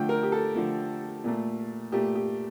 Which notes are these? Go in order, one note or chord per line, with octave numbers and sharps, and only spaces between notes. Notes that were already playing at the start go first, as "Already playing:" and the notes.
Already playing: D3 F3 A3 G5
A#4
G4
A4
D3 F3 A3
A#2 A3
A#2 A3 G4
G4